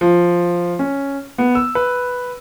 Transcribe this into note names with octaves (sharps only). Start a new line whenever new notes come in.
F3
C#4
B3
E6
B4